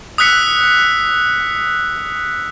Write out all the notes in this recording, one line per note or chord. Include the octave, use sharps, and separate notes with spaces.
D#6 E6 F#6 B6 C#7